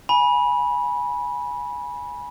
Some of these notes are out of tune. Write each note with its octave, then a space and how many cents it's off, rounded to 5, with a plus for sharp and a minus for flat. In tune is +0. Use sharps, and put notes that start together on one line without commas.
G#5 +0 B5 -20